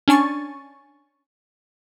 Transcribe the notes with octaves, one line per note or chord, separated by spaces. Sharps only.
C#4 D4 G#5 C#6 A6